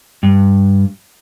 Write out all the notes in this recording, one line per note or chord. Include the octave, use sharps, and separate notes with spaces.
G2